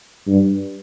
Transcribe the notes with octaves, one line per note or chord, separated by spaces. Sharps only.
G2